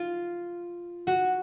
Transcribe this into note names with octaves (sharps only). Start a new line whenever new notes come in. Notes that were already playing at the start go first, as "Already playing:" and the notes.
Already playing: F4
F#4